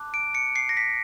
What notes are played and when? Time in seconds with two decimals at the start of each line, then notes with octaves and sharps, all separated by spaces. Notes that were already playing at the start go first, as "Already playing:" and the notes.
Already playing: A5 D6 F#6
0.14 D7
0.35 C#7
0.56 C7
0.69 A#6
0.77 B6